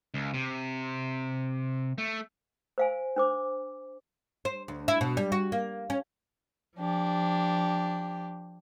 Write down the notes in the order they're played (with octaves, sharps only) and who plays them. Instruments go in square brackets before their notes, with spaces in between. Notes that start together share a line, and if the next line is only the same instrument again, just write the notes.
[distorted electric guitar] C#2
C3
A3
[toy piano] C5 F5 G#5
D4 C5 D6
[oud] C5
D2
E4
B2
G3
F#4
A#3
C#4
[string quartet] F3 D4 G4